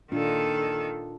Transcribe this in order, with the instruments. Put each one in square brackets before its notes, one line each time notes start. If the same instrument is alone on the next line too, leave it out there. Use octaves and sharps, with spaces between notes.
[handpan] A#2 D4 F4 [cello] D#3 A4